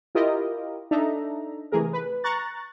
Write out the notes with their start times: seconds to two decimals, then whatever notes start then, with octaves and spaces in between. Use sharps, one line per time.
0.15 E4 F4 G4 A#4 D#5
0.91 D4 D#4 A4 E5 A#5
1.72 C3 E3 A3 G#4 A#4
1.93 B4
2.24 A#5 C#6 F#6 A6